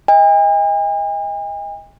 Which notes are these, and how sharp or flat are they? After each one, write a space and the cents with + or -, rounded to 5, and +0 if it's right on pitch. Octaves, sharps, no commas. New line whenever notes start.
D#5 +30 G#5 -45